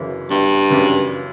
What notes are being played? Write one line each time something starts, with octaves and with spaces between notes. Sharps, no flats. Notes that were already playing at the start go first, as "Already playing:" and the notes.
Already playing: G1 F#2 C#3 E3
G1 G2
F#2 C#3 E3